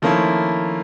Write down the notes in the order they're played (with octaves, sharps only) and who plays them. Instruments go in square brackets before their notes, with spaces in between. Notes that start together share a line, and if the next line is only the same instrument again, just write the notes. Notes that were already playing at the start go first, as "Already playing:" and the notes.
[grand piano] D#3 F3 A3 A#3 C#4 E4